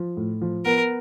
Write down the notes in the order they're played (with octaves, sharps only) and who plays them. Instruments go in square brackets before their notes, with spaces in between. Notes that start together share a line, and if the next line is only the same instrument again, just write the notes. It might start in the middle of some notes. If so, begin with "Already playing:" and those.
Already playing: [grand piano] F3
A2
F3
[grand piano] B3 [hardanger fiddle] A#4